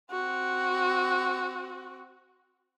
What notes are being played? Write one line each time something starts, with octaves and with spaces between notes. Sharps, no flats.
C4 F#4